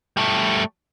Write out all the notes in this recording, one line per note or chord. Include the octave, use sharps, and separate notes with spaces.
G3 A3